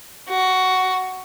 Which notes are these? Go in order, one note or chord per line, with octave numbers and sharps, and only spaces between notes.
F#4